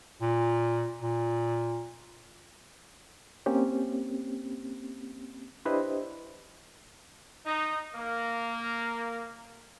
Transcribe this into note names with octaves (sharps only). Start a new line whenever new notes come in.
A#2
A#2
A#3 C4 C#4 G4
D4 E4 G4 B4 C5 D#5
D#4
A#3